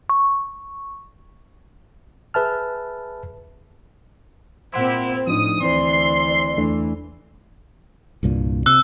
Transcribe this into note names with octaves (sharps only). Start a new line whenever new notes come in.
C#6
G#4 B4 E5 A5 F6
A#2 C4 E4 G4 C5 F#5 C6
A2 F3 D4 D#4 D#6
D2 E3 C4 C5 D5 C6
E2 E3 A3 D4
C2 G2 A#2
C3 E6 F#6